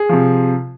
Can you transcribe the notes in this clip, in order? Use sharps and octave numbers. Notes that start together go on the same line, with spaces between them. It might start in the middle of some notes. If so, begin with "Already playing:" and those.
Already playing: G#4
C3 F3